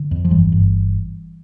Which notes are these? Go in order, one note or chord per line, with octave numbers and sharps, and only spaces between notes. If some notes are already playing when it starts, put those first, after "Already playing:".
Already playing: D3
F2
F3
G1 E3 G3
G1